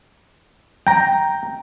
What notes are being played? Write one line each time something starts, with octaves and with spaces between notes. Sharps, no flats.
G5 A#5